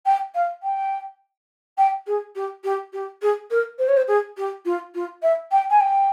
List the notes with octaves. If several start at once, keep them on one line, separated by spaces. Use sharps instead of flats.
G5
F5
G5
G5
G#4
G4
G4
G4
G#4
A#4
C5
C#5
C5
G#4
G4
F4
F4
E5
G5
G#5
G5